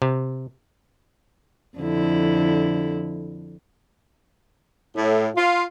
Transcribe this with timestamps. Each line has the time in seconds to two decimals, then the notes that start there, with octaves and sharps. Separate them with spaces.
0.02 C3
1.78 F2 D3 E4
4.95 A2
5.35 F4